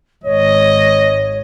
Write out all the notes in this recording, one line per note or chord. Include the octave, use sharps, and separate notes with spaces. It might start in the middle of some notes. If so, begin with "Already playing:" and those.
G#1 C#5 D#5